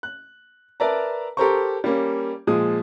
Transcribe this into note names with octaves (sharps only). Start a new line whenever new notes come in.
F#6
A#4 B4 D5 E5 A5 A#5
G4 A4 A#4 C5 A#5 C#6
G3 A#3 C#4
A#2 F3 G#3 D#6